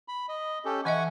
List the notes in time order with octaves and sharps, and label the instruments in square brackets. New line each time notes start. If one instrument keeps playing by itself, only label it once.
[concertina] B5
D#5
C#4 G4 A4
[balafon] E3 D#5 E5 [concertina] F#5 G#5 C#6